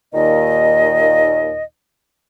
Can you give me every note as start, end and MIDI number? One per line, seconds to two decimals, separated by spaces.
0.13 1.64 39
0.13 1.64 46
0.13 1.64 51
0.13 1.64 75